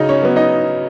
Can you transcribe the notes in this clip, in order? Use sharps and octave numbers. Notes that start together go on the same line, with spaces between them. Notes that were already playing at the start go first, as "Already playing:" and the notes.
Already playing: C#3 F#3 D#4 D#5
C#4 C#5
F#3 B3
D#4 D#5